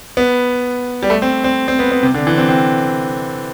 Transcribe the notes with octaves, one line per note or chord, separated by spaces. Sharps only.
B3
G3
A3
C4
C4
C4
B3
B3
C3
D3
E3
C4
C4